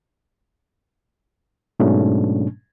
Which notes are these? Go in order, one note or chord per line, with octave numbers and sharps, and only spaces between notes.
G#2 B2 F#3 A3 C#4 D4